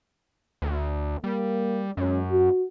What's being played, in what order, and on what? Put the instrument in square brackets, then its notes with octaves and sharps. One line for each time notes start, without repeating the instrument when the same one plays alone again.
[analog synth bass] D2
[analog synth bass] G3 [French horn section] A#3
[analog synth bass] F#2 [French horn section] F#3 G#3 C#4
[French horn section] F#4